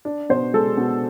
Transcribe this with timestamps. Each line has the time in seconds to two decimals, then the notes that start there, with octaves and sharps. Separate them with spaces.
0.05 D4
0.29 B2 C5
0.53 G#3 A4
0.77 B2